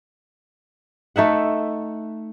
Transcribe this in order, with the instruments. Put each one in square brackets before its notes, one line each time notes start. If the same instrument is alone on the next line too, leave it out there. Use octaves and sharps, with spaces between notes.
[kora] A3 D#4 E5 F#5